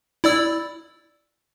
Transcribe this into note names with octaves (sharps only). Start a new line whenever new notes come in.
E4 D5 E6